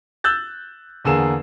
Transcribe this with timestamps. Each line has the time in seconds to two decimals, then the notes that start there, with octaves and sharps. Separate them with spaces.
0.24 E6 F#6 G6 A6
1.05 E2 D3 A#3 G#4 E7